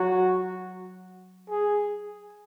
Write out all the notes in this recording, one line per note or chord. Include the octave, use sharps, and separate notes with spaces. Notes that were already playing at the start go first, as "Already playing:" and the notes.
Already playing: F#3 F#4
G#4